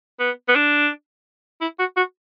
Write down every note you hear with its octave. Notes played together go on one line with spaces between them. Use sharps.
B3
B3
D4
E4
F#4
F#4